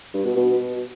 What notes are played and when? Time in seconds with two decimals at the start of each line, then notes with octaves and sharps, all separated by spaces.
0.14 G2
0.25 B2
0.36 B2